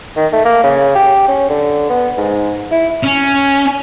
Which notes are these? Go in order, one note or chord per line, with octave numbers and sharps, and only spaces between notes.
D#3
A3
A#3
C#3
G4
C#4
D3
B3
G#2
E4
C#4